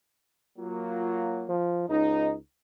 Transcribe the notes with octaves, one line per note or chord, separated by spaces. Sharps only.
F#3 A#3 F4
F3
C#2 D#4